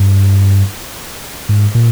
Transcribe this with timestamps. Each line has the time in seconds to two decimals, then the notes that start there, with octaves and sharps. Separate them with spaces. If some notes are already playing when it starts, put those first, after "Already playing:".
Already playing: G2
1.49 G#2
1.75 A#2